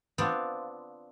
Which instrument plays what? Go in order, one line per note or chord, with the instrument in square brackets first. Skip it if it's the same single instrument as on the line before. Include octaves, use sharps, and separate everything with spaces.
[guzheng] B3 C4 D4 F4